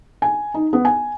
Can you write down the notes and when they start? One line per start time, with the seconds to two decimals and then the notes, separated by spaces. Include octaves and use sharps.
0.22 G#5
0.54 D#4
0.73 B3
0.85 G#5